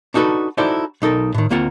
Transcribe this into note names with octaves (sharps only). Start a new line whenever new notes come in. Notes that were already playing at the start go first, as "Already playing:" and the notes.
D4 D#4 F#4 G#4 A4 B4
D#4 E4 F#4 A4 C5 D5
B1 D#4 A4 A#4
A2 D#3
D2 A#3 C4 F4 F#5